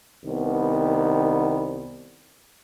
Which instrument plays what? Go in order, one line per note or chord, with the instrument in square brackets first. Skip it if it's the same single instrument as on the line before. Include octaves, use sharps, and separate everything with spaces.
[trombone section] C2 D#3 B3